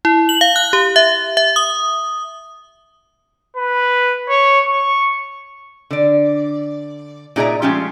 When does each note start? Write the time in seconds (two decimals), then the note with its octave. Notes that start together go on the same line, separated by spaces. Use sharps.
0.05 E4
0.29 F#7
0.41 F5
0.56 F#6
0.73 G4
0.96 E5
1.37 E5
1.56 D#6
3.56 B4
4.29 C#5
4.66 C#6
5.91 D3 D5
7.36 A#2 D#4 G#4 D5 E5 A#5
7.62 F3 G#3 A3 C#4 F4 G4